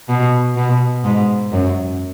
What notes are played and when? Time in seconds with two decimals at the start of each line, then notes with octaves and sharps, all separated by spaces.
0.09 B2
0.56 B2
1.04 G#2
1.52 F#2